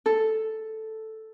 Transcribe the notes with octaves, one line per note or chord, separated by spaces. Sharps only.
A4